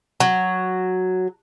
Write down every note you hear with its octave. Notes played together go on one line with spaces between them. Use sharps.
F#3